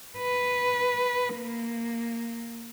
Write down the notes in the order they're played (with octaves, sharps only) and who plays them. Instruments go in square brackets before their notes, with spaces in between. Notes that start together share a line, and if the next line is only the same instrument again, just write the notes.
[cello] B4
A#3